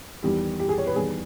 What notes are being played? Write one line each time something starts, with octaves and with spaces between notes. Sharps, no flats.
E2 D#3 G3 G4
G4
G#4
C#5
B4
E2 D#3 G3 G#4